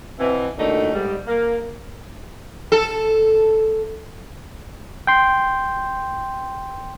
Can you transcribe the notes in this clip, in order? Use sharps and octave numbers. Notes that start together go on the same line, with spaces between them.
B2 E3 C4
A#2 D3 F#3 A3 D4 D#4
G#2 G3
A#3
A4
G5 C6